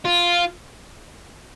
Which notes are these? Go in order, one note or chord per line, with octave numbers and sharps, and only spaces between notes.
F4